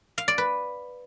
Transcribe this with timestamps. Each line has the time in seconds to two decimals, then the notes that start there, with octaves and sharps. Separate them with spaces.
0.18 F5
0.28 D5
0.38 B4